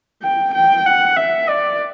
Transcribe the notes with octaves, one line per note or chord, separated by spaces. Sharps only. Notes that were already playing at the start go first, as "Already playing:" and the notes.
G5
G5
F#5
E5
D5